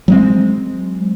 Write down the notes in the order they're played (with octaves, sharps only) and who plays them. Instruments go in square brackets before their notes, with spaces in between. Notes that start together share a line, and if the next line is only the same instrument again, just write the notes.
[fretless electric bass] F#3 G#3 C4